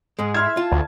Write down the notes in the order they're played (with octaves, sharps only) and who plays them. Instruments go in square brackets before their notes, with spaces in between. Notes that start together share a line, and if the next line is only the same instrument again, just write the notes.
[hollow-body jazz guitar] G#2 G#3 [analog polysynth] G#4
[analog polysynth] E4 E5 [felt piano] C6 F6 G#6
[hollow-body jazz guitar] F4 [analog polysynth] A5
[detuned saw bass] D2